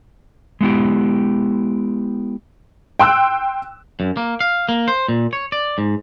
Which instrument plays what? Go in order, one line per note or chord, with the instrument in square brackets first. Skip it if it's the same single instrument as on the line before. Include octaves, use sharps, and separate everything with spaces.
[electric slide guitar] G#3 B3 E4 G4
[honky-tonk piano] G5 C6 E6 F#6
[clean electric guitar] F#2
A#3
F5
A#3
C5
A#2
C#5
D5
G#2